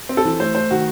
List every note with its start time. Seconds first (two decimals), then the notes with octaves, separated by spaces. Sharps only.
0.09 C4
0.17 A4
0.25 E3
0.40 A3 C5
0.55 A3 C5
0.71 D#3 F#4